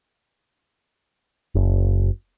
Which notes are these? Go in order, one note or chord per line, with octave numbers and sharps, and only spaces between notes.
F#1